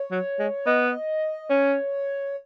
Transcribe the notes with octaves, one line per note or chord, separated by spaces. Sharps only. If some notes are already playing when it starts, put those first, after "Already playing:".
Already playing: C#5
F#3
G#3
B3 D#5
C#4 C#5